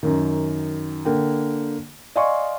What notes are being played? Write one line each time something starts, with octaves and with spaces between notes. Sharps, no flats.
F#2 D#3
D3 A#3 G5
D5 D#5 F5 G#5 C6 C#6